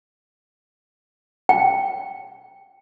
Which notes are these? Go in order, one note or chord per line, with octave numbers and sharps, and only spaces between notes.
G5